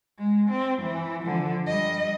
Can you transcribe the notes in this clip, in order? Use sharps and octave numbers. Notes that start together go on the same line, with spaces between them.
G#3
C4
E3
D3 F3
G3 D#5